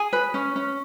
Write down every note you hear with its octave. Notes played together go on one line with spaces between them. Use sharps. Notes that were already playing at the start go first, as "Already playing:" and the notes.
Already playing: G#4 G#5
B4
C#4
C#4